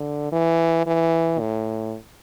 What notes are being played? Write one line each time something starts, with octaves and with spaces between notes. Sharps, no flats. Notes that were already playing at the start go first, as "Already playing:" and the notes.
Already playing: D3
E3
E3
A2